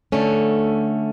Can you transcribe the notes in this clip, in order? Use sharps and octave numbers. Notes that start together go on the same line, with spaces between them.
D3 A3 C#4